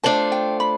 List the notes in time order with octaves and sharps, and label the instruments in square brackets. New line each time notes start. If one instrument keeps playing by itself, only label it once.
[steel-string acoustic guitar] A3 D4 F4 C5 [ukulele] A5
[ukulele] G5
B5